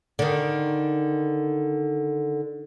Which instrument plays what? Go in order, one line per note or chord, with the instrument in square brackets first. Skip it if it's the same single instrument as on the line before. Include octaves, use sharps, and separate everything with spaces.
[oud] D3 D#3